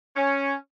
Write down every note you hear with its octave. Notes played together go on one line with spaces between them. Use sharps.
C#4